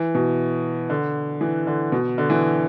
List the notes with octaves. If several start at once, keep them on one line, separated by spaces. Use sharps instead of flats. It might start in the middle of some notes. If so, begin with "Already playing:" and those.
Already playing: E3
B2
D3
E3
D3
B2
D3
E3